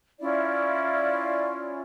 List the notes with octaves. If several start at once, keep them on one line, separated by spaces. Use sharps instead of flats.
C#4 E4 F4 D5